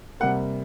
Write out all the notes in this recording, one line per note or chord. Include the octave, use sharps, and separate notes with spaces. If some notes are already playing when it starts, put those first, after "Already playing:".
C3 G3 A#3 F#5